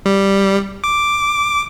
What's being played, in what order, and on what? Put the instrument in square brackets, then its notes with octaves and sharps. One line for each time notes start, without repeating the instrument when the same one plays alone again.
[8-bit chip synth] G3
D6